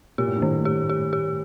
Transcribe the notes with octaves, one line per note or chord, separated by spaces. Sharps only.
A#2 G4
A2
G2
A2 D#3
G4
G4
G4